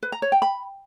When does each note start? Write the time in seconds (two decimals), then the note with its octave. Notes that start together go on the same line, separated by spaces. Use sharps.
0.03 B4
0.12 A#5
0.22 C#5
0.32 G5
0.42 B5